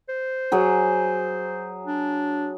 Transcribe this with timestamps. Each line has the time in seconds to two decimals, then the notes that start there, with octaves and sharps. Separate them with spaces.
0.09 C5
0.52 F#3 G#4
1.87 D4